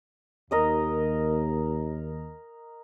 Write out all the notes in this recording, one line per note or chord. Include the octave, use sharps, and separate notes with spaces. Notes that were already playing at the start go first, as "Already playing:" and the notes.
D#2 A#4 D#5 D#6